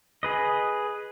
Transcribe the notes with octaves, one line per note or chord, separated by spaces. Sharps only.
G#4 B4 D#5